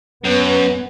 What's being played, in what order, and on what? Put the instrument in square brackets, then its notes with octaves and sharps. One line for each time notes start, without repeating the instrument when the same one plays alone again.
[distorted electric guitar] F#2 [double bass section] B3